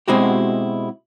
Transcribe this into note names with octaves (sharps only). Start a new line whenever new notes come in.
B2 G#3 C4 E4 F#4 G4